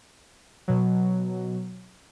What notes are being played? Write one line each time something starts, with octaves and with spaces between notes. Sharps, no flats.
B2 F#3